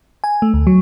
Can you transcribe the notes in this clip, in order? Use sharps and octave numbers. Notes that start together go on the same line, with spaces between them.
G#5
A3
D2
F#3